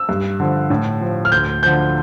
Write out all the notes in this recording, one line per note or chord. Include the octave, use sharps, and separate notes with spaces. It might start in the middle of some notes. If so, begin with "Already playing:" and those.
Already playing: E6
G2
D3 F3
A2
F3
F6
D2 G6
D3 F3 G6